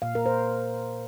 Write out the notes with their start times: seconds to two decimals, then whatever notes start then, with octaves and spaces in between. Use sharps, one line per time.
0.02 A#2 A#3 F5
0.15 A#4
0.26 C5